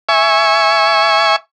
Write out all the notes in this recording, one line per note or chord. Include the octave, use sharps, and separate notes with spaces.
E5 G#5 C#6